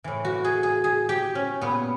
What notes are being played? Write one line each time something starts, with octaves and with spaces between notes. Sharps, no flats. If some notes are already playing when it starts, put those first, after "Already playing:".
A2 E3
F#4
G#4
G#4
G#4
G4
C#4
A#2 B3